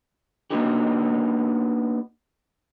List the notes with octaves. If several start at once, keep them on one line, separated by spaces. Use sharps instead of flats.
A#3 B3 D4 D#4 F#4 G4